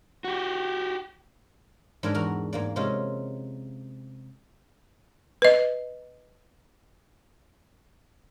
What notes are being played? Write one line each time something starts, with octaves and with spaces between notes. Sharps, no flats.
F#4 G4
G#2 D4 E4 A#4 B4
E2 F#4 A#4 A#5
G#2 A#3 D5
C3 G#3 C4 C#4 F4 G4
B4 D#5